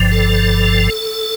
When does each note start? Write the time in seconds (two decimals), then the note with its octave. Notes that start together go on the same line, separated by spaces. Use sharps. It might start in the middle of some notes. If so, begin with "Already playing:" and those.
Already playing: G1 G2 F3
0.12 A4